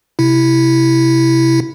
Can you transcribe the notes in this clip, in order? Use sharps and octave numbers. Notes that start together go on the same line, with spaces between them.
C3 E4